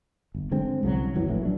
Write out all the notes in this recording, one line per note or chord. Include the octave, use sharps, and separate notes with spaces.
G1
D3 G#3 C4
C2 C#3 F3 F#3
F#1 E3 F#3
A#1 A2 E3
F#3 D4